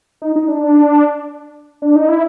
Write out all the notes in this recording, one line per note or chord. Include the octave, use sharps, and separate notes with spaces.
D#4
D#4
D4
D4
D#4
E4